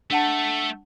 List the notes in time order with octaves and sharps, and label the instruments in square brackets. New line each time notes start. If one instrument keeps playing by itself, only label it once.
[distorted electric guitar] A3 [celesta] D4 F#5 A5